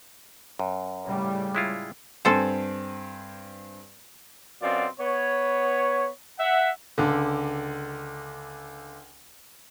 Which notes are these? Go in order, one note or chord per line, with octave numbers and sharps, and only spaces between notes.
F#2
A2 C#3 G3
G#3 E4 F4
G2 C4 A4 C5 G#5
F#2 B2 C4 F4 D5
B3 C#5
E5 F#5
C#2 D3